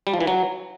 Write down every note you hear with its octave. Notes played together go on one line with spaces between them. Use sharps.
G3
F3
E3
F#3